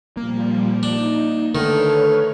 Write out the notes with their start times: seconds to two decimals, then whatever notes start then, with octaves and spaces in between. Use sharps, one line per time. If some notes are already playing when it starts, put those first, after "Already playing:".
0.17 A#2 F3 G3 A#3
0.83 D4 D#4
1.55 D3 D#3 A3 B4 C#5 F6